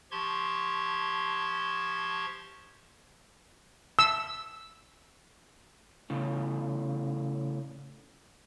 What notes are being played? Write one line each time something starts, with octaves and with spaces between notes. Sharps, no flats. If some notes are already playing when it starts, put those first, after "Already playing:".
F3 G4 A5 C6 C#6 G#6
E6
A2 C#3